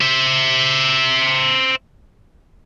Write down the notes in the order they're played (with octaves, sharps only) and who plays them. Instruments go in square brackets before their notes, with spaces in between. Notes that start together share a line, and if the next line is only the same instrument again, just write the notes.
[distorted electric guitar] C5 E5